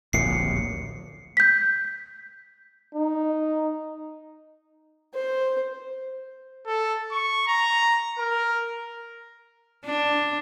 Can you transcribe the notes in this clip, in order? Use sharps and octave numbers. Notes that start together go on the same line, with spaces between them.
D1 A#1 D#2 C7 C#7
G6 B6
D#4
C5
A4
C#6
A#5
A#4
D4